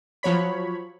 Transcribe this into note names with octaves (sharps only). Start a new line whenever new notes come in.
F3 F#3 C#5 B5